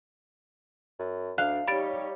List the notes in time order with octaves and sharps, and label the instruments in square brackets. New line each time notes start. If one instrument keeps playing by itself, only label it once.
[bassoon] F#2
[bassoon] D2 [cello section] D4 [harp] F5 [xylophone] F#6
[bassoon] G3 [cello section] D#4 G4 C#5 [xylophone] B5 A6 D7